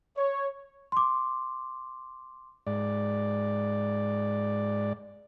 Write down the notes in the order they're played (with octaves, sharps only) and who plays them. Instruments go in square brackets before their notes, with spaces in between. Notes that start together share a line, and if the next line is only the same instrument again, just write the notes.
[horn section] C#5
[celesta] C6 D6
[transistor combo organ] G#2 D5